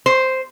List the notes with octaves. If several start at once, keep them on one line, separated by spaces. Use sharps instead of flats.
C5